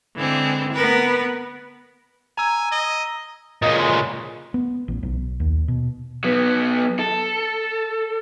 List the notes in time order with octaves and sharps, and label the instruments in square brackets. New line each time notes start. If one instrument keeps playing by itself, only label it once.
[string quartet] D3 E3 G#3 C4
B3 A#4 B4
[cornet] G#5 [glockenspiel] A#5 E6
[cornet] D#5
[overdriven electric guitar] A#2 C#3 [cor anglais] D#5
[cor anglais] G#3
[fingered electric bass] B3
A1
B1
D#2
B2
[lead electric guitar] F#3 B3
A4